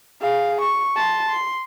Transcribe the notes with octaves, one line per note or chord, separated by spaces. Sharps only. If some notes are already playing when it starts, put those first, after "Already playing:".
G#4 F5
C#6
A5 C6
C6